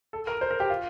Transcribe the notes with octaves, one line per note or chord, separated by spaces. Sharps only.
A4
A#4
C5
A#4
G4
F4